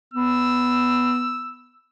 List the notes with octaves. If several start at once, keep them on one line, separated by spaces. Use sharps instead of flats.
B3 E6